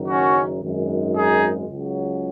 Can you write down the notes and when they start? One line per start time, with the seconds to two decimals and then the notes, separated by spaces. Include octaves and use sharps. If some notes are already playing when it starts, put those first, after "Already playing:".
Already playing: F#1 F#2 D#3 F#3
0.08 C#4 F#4
0.62 G#1 F#2 D#3 G#3
1.15 D#4 G#4
1.70 C#2 C#3 F#3